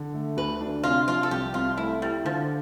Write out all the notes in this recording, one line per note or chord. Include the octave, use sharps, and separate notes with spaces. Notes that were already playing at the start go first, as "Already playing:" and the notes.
Already playing: D3
A3
D2 B4
D4
C3 F4
F3 F4
A4
C2 G4
C2 F4
A3 E4
G3 E4
D3 F3